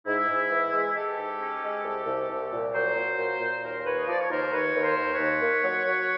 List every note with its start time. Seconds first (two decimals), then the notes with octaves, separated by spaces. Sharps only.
0.06 G#2 E4
0.29 G#2
0.51 E3
0.73 G#3
0.95 G#3 G4 A4
1.17 G#2
1.40 C#4
1.62 G#3
1.85 C2
2.06 C2
2.29 C2
2.51 A#2
2.74 F#3 A#4 C5
2.96 F#3
3.19 A#2
3.40 A#2
3.63 D#2 A#4 C5
3.85 D#2 B4 C#5
3.97 D#5
4.08 F3 D5
4.19 C#5
4.30 D#2 A#4 C5
4.52 D#2 B4 C#5
4.75 D#2
4.82 A#4 C5
4.97 D#2
5.11 B4 C#5
5.19 D#2
5.42 A#3
5.64 F#3
5.86 F#3